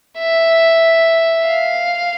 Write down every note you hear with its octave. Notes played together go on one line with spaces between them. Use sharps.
E5
F5